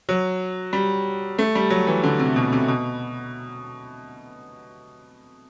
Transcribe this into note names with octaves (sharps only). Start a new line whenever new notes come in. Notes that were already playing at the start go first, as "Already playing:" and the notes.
F#3
G3
A3
G3
F#3
E3
D3
C3
B2
C3
B2